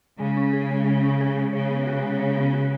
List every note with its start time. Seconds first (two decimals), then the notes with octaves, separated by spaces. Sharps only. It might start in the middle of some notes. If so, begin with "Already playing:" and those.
0.19 C#3 G#3
0.37 C#4
0.53 G#4
0.70 G#3
0.86 G#3
1.03 C#4
1.20 G#4
1.37 G#3
1.53 C#3 C#5
1.70 B3
1.87 F#4
2.03 G#3
2.20 C#5
2.36 B3
2.53 F#4